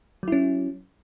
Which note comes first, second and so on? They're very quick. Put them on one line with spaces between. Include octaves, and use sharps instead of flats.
F#3 E4 C#4